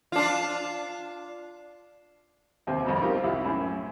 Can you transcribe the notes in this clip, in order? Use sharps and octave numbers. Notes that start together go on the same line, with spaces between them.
D4 F4
D#2 C3 C4
C2 F2 B2
C4 D#4 F4 G4 A#4
C2 E4
F#2 A2